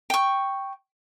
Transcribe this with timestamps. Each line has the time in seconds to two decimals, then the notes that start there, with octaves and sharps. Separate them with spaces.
0.10 G5 C#6